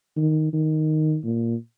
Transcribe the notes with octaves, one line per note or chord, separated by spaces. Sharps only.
D#3
D#3
A#2